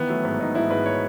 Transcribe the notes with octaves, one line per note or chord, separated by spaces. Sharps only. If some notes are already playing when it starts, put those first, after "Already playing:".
Already playing: D#3 E3 B3
F#3 A3
G#2 B3
G#2 D#4
G#2 E4
G#2 B4
C#5